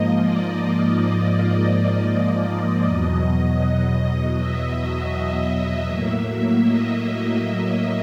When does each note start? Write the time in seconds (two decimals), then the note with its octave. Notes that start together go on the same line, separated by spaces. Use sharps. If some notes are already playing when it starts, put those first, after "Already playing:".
Already playing: G#2 F3 A#3 D#5
0.18 D5
1.32 D5
2.84 E2 B2 F#3 D#5
4.36 E5
5.88 A2 F#3 A#3
6.63 D#5